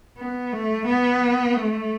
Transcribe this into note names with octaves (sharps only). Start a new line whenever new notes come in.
B3
A3
B3
A3